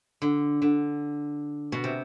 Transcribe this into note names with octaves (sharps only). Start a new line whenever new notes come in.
D3
D3
B2
C3